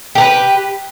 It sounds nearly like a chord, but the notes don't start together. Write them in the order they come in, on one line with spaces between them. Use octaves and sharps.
G4 A#4 B4